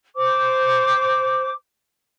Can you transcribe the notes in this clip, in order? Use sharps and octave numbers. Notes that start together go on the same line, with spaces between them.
C5 D6